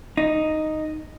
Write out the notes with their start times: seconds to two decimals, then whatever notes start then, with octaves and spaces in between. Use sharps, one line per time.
0.17 D#4